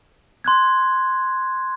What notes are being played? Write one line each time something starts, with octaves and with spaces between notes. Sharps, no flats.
C6 F#6 G#6